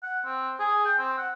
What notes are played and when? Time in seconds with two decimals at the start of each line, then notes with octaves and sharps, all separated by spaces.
0.03 F#5
0.25 C4
0.60 G#4
0.86 G5
0.98 C4
1.18 F#5